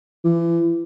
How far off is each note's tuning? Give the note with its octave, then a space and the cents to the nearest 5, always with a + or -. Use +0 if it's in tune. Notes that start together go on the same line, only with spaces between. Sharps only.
E3 +35